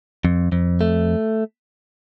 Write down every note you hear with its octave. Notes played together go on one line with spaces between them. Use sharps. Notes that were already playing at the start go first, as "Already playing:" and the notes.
F2
F2
A3